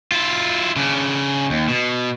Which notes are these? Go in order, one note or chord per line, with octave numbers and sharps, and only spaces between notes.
E4 F4
C#3 D4
D#2
B2